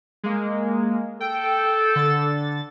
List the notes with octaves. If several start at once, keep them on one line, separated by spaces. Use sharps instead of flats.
G#3 A#3
A4 G5
D3 A6